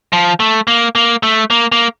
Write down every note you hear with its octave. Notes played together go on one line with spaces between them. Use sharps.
F3
A3
A#3
A#3
A3
A#3
A#3